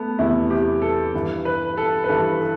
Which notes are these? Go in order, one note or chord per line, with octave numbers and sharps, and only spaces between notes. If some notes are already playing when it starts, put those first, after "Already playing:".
Already playing: A3 B3
E2 C3 E3 E4
G4
A4
G2 E3
B4
A4
B4
G2 E3 A4
A4